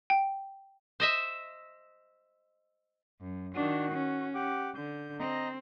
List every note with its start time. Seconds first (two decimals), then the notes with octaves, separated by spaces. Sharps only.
0.10 G5
1.00 C5 D#5 E5
3.21 F#2
3.55 D#3 D4 F#4
3.92 C#4
4.35 G4 F#5 D6
4.75 D3 G6
5.20 C4 D#5 A#5